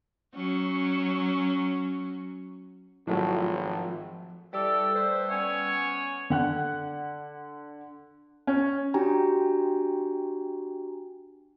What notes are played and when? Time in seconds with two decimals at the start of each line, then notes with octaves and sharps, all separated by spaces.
0.35 F#3 C#4
3.07 G#1 A2 F3 F#3 A3
4.53 E3 G3 G4 A4 D5 E6
4.95 A3 B4 C5
5.31 B3 C#4 C#5 G#5
6.30 D3 F#5 F#6
8.47 C#4
8.94 D4 F#4 G4 G5 G#5 A#5